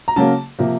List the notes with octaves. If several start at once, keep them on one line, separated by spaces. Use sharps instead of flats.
A#5
C#3 F#3 A#3 A5
C3 F3 A#3